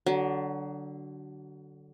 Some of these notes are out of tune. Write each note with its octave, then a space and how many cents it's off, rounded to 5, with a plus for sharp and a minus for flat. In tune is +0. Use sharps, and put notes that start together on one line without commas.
D3 +0 F#3 +25